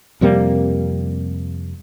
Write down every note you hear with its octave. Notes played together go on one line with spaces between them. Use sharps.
F2 C3 G3 A#3